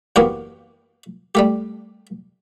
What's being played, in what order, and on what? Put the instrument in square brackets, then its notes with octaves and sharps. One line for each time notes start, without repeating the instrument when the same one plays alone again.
[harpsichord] F#2 E3 A#3 B3 G4 C#5
G3 A3 G4